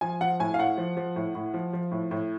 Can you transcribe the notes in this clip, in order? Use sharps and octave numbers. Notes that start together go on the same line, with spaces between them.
F3 G#5
F3 F#5
A2 G#5
F5
A2 F#5
F3
F3
A2
A2
F3
F3
A2
A2